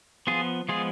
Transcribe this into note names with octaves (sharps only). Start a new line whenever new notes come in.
F3 B3 F4 G#4
F3 G#3 B3 F4 G#4